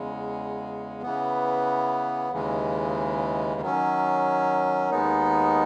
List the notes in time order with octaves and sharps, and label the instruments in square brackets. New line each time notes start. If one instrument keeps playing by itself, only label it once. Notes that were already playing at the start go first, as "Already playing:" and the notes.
Already playing: [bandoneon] E2 C#3 G#3
C#3 E3 B3
D#2 C#3 E3 G#3
D#3 F#3 C#4
D#2 D#3 G#3 B3 D#4